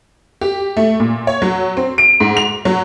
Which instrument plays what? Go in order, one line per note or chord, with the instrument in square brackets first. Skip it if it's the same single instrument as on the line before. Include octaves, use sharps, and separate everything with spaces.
[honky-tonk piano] G4
A3
A#2
C#5
F#3
C4
D7
G#2
F7
F#3